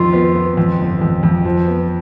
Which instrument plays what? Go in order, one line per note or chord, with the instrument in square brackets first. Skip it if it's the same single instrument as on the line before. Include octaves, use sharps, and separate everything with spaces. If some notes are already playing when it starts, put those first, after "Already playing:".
Already playing: [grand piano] F2 D#3 [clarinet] F4
[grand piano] B3
B3
F2
G1
F2
F2
F3
B3